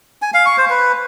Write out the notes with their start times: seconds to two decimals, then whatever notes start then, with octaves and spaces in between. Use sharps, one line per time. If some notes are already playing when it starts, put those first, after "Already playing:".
0.22 G#5
0.34 F5
0.46 C#6
0.58 C5
0.70 B4